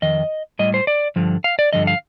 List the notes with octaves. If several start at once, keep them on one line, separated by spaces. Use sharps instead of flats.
F2 D#3 D#5
A2 G3 D#5
C5
D5
G2 D3 F3
F5
D5
G2 D3 F3 D#5
F5